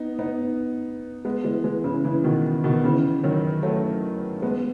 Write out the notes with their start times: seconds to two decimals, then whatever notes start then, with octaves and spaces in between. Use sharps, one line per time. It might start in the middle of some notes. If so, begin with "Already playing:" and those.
Already playing: B3 D#4
0.19 B3 D#4
1.25 G#3 B3
1.44 E3 G#3
1.64 E3 G#3
1.84 C#3 E3
2.04 C#3 E3
2.24 B2 D#3
2.64 B2 D#3
2.84 C#3 E3
3.23 D#3 F#3
3.63 F#3 A3
4.42 G#3 B3